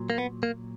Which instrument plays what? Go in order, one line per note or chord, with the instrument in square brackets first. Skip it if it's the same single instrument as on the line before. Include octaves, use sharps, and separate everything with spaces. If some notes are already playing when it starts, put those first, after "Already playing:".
Already playing: [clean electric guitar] A#2 F#3
A#3
B3
A#3